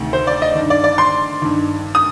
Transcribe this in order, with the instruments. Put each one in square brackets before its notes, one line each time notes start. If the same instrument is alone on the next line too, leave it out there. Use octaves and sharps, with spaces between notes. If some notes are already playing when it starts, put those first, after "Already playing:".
Already playing: [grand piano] D2 C3 D#3
C5
D5
D#5
G2 D#3
D5
D5
C6
G2 D#3
D#6